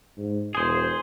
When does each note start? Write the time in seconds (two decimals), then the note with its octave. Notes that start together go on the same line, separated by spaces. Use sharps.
0.17 G#2
0.55 E1 G#4 C5